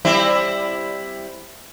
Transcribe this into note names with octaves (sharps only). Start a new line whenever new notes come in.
G3 C4 E4